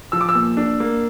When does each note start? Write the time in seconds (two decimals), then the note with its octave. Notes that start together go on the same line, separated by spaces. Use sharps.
0.12 F3 E6
0.21 D6
0.29 E6
0.35 A#2
0.57 D4
0.80 A#3